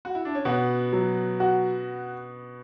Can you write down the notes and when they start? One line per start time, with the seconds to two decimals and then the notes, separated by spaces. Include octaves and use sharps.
0.05 F#4
0.15 E4
0.25 D4
0.35 C#4
0.45 B2 B3 F#4
0.93 F#3
1.40 F#4